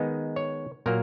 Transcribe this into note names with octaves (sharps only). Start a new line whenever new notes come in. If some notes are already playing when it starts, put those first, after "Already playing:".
Already playing: D#3 G#3 B3 D#4
C#5
A#2 F#3 A#3 A#4